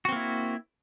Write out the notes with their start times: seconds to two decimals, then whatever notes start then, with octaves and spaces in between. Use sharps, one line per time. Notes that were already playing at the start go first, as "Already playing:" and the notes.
0.05 F#4
0.09 C4
0.12 A#3
0.16 E4